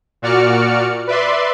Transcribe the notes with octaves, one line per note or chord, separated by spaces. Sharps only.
A#2 F#4 D5 F6 C#7
B4 D5 E5 C6